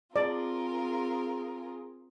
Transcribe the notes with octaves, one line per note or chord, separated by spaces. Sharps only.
C4 F4 G#4 A#4 D5